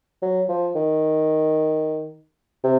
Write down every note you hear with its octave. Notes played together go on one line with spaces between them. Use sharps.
F#3
F3
D#3
C3